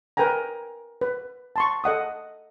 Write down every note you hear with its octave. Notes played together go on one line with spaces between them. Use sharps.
A#4 B4 G5 G#5 A#5
B4
A5 C6 C#6
A4 D#5 F#5 D#6